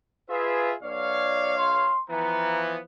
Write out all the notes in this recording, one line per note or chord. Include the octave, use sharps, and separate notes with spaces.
F4 G#4 B4 E5
B1 C#5 D5 F5
C6
E3 F3 B3 A#5